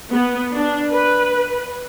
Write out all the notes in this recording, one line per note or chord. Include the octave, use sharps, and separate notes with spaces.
B3
D4
B4